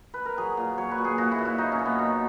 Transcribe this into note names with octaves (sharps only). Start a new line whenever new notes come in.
B4
A#4
F#3 G#4
A#2
F#3 C#5
B4
A#2
G#4
A#2 F#4
E4
A#2
E4
F#3 D#4
C#4
A#2
B3
B2